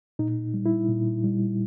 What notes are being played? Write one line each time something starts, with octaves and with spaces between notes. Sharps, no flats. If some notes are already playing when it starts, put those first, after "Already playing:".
A#2 D#4
G3
E4
A#2
G3